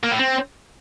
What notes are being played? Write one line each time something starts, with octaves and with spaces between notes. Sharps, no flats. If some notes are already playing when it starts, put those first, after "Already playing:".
A#3
A2
C4